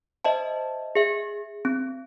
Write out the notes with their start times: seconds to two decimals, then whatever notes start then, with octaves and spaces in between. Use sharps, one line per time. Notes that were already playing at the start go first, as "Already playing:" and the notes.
0.24 C5 D#5 E5 A5
0.95 G#4 E5
1.65 C4